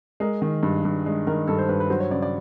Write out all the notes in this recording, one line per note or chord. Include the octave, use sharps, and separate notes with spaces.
G#3 A#4
D#3
G2
G2
G#3
D#3 A#4
G2 A4
C5
G2 B4
B4
F#3 C5
C#5
C#3 D5
D5